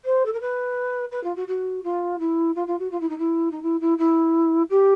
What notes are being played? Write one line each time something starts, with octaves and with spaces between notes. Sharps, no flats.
C5
A4
A#4
B4
B4
F4
F#4
F#4
F4
E4
F4
F4
F#4
F4
E4
D#4
E4
D#4
E4
E4
E4
G4